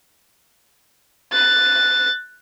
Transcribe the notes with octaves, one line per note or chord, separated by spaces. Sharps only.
F#6 A6